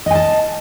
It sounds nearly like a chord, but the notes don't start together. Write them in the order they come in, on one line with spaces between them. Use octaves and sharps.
D#5 G#5 A5